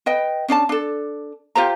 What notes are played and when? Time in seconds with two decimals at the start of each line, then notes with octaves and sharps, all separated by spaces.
0.06 B4 D#5 G5
0.48 C#4 D4 D5 A5
0.69 D4 A4
1.55 F4 G4 C5 A#5